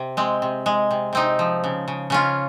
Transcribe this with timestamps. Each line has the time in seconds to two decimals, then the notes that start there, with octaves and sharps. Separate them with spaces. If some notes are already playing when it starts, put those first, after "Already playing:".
Already playing: C3
0.17 G#3 C4
0.42 C3
0.66 G#3
0.91 C3
1.13 C3 C4 D#4
1.39 F3
1.64 C#3
1.88 C#3
2.10 C#3 C#4 F4